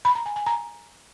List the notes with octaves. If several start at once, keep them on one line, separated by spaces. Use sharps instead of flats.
B5
A#5
G#5
G#5
A#5